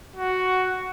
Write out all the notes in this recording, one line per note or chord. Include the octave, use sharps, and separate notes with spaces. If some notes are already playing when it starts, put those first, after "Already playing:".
F#4